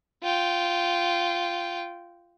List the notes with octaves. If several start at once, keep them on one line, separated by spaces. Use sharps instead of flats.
F4 G5